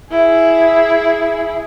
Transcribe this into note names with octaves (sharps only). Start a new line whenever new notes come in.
E4 G#4